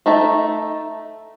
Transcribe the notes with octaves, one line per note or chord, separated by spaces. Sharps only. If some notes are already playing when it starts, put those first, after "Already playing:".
A3 D#4 E5 A5